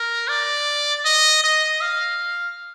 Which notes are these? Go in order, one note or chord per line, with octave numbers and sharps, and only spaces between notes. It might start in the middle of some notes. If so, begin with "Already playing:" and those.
Already playing: A#4
D5
D#5
D#5
F5